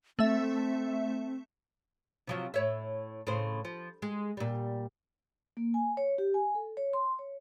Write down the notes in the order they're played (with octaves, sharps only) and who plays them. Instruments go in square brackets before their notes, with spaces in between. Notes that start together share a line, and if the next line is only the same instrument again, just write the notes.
[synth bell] A3 E5 [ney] C4
[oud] C3 F3 F#3
A2 C#5 E5
A2 C#3 C5
F3
G#3
A#2 G3
[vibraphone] A#3
G#5
C#5
G4
G#5
A4
C#5
C6
C#5